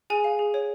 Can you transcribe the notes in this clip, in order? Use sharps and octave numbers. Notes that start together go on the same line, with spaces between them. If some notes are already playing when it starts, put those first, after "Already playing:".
G#4 G#5
F5
G#4
C#5